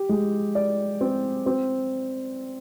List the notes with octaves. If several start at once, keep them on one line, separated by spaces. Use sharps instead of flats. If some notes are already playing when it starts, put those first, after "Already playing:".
Already playing: G4
G#3
D5
C4
C4